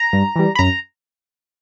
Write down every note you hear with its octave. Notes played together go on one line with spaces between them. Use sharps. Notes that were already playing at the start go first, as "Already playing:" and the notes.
Already playing: A#5
G2
E3 G3
B5
F#2 A#5